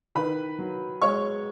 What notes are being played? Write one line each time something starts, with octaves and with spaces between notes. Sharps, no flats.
D#3 B4 B5
F#3
G#3 C#5 C#6